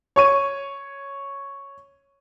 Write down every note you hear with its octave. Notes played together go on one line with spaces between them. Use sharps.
C#5 C#6 D#7